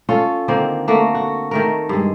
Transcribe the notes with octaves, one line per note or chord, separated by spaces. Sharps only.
C#4 F4 A4
D3 D#3 A#3 C4
A3 A#3 F#4
F#4
D#3 A3 A#4
G2 G#3